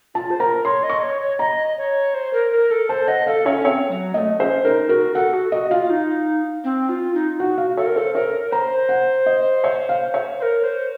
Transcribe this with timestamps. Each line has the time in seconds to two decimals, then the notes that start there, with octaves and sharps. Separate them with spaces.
0.15 F4 A5
0.30 C5
0.40 A#4 A#5
0.64 C#5 C6
0.83 D#5
0.90 C#6
1.03 C#5
1.21 C#5
1.39 D#5 A#5
1.78 C#5
2.14 C5
2.33 A#4
2.52 A#4
2.71 A4
2.89 C5 A5
3.08 D#5 F#5
3.27 A4 F5
3.46 C#4 C#5
3.64 C4 C#5
3.90 F#3
4.14 A#3 D#5
4.18 A3
4.39 C#4 C5
4.64 D#4 A#4
4.89 F#4 A#4
5.14 A4 F#5
5.34 F#4
5.52 F#4 D#5
5.71 F4 F5
5.90 D#4
6.64 C4
6.89 F4
7.14 D#4
7.39 F#4 F#5
7.58 F5
7.77 A4 C#5
7.86 A#4
7.96 A4 C5
8.14 A#4 C#5
8.51 C5 A#5
8.89 F#5
9.26 D#5
9.64 C#5
9.89 F5
10.14 C#5
10.39 C5
10.43 A#4
10.64 C5